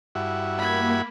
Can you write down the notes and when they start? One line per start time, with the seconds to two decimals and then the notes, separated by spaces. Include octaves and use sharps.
0.15 G2 E4 F#4
0.59 A#3 B5 G#6